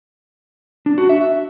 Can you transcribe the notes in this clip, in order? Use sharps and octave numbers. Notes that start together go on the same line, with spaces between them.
D4
F#4
E5